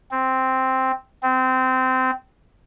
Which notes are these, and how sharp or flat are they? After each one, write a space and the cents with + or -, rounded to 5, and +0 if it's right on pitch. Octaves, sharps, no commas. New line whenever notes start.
C4 +0
C4 -20